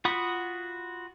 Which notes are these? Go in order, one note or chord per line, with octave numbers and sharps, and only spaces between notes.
F4 F#4 F#5 B5 D#6